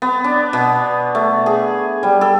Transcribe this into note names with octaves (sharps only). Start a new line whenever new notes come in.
B3
D4
B2
A3
G#4
G3
A4